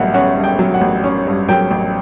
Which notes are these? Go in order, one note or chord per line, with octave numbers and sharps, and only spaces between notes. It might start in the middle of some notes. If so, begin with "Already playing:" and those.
Already playing: A1 G2 F#3 E5 F#5
C#4 F#5
G2
G5
F#3
F#5
A1
C#4
G2
F#3 G5
A1